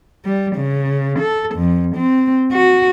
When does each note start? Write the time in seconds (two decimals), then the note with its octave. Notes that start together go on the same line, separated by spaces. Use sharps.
0.25 G3
0.56 C#3
1.19 A4
1.55 F2
1.96 C4
2.52 F#4